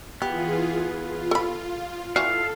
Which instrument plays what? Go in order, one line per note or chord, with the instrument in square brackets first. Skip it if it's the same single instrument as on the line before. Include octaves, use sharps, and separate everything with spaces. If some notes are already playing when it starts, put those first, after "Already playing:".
[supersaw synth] E3 F4 G#4 [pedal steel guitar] B3 [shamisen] G4
[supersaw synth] F4
[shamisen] A4 B5
[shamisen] E3 F#4 D5 [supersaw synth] A4 [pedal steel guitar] F5